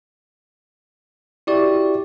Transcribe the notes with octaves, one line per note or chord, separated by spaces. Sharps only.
E4 F#4 G4 D5 C#6